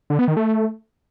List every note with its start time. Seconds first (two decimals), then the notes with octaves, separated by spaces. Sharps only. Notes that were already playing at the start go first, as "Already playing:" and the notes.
0.10 D3
0.19 B3
0.28 D#3
0.37 A3